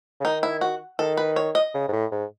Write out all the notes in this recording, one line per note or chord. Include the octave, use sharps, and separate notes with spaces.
C#3
D#3 D#4
E4
F#4
D#3 A4
B4
C#5
D#5
C#3
G#2
A2
G#2